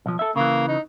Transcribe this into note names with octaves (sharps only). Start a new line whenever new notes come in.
B1 F3
A4 E5
C#3 E3 A#3
D#4